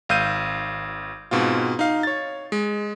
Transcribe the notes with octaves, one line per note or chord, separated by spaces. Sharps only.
G#1 F5 E6 G6 D#7
G#2 B2 C4 F4
D#4 F5
C#5 A6
G#3